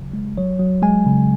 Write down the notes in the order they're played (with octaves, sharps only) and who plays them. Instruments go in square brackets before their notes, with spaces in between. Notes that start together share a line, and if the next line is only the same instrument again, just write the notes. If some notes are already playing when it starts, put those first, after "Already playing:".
Already playing: [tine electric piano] C#3 F#3
G#3
F#3 C#5
F#3
G#3 G#5
C#3